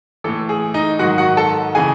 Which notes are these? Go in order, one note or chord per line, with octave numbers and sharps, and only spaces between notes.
A2 E3 A4
G#4
D#4 D#5
G#2 D#3 F#3 F#4 F#5
F#4 F#5
A4 A5
C#3 E3 G#4 G#5